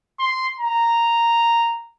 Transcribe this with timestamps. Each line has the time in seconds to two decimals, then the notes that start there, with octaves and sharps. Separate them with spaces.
0.19 C6
0.60 A#5